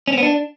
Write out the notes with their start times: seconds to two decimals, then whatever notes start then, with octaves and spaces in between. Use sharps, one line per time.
0.07 C#4
0.13 C4
0.18 B3
0.23 D4